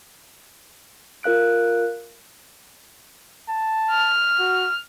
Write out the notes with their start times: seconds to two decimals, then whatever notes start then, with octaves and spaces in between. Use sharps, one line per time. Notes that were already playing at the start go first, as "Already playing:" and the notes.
1.23 F4 A#4 F5 F#6 D7
3.49 A5
3.91 F6
4.39 F#4